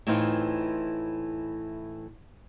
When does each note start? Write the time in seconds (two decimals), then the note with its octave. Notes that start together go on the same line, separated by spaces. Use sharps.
0.07 A2 E3 C4 D#4 F4